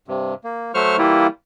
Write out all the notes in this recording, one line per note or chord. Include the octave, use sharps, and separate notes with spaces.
G2 C3
A#3
F#3 A3 C5 C#6 F6
E3 G3 A#3 E4 F4